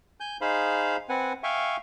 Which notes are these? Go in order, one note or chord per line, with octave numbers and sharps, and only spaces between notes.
G#5 G6
D#4 G#4 C5 F5 B5
C4 B4 F#5 G#5
E5 F5 G5 G#5 C#6